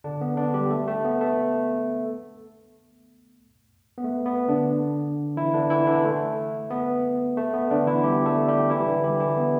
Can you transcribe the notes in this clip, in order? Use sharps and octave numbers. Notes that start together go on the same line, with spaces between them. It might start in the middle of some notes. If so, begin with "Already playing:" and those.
D3 D4
B3
D3 D4
G3 G4
A3 A4
A3
B3
A3
B3
A3
B3
D3 D4
E3 E4
D3 D4
E3 E4
D3 D4
A3
B3
A3
B3
D3 D4
E3 E4
G3 G4
A3 A4
G3 G4
E3 E4
D3 D4
G3 G4
E3 E4
B3